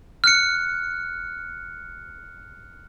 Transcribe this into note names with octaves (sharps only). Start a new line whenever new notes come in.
F6 F#6 C#7